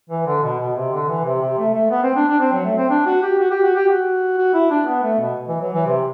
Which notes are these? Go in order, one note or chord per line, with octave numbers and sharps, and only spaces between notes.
E3
D3
B2
B2
C3
D3
E3
C3
C3
A3
A3
B3
C4
D4
D4
C4
F#3
A3
C4
D4
F#4
G4
F#4
G4
F#4
G4
F#4
F#4
E4
D4
B3
A3
B2
E3
F#3
E3
C3